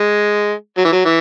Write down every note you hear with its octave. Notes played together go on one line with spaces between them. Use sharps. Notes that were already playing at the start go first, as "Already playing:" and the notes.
Already playing: G#3
F#3
E3
F#3
E3